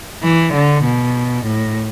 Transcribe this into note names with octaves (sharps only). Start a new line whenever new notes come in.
E3
D3
B2
A2